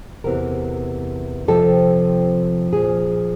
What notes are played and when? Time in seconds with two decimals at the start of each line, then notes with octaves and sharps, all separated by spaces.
0.24 E2 C3 E3 A#4
1.48 F2 C3 F3 A4
2.72 A#2 F3 G#4